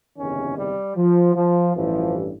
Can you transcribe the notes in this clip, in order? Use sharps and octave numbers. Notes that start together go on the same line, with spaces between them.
F#1 E2 C3 D#3 C#4
G3
F3
F3
A1 G2 E3 F3